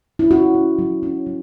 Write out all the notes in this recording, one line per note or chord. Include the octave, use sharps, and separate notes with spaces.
E4
C#4 F#4
C#4
F#3
C#4
F#3